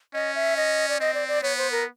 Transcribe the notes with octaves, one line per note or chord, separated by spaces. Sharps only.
C#4 D#5
E5
D#5
D5
C4 D#5
D5
D5
B3 C#5
C5
A#4